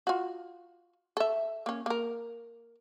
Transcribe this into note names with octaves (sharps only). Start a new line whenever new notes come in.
F4 F#4
A4 E5
A#3 C#4
A#3 A#4